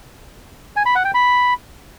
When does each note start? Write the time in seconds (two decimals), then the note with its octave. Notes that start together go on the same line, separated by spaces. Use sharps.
0.76 G#5
0.86 B5
0.95 F#5
1.05 G5
1.14 B5